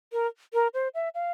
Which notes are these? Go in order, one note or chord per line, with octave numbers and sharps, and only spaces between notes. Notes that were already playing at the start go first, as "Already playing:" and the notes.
A#4
A#4
C5
E5
F5